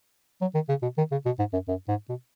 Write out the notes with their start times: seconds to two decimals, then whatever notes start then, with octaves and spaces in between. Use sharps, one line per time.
0.41 F#3
0.54 D#3
0.69 C#3
0.82 B2
0.98 D#3
1.12 C#3
1.26 B2
1.39 G#2
1.53 F#2
1.68 F#2
1.88 G#2
2.09 B2